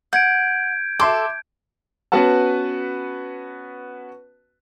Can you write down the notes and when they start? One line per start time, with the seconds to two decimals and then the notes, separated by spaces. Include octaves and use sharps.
0.13 F#5 G6 G#6 D7
1.00 A4 E5 C6 D6
2.12 B3 C#4 F#4 B4 F#5 A5